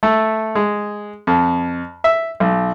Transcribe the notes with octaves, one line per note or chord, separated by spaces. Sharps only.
A3
G#3
F2
E5
B1